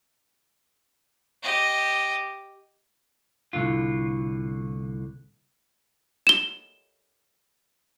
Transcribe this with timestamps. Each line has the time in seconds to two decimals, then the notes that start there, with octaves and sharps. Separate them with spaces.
1.43 G4 D#5
3.53 C2 A2 D3 F4
6.27 E7 G7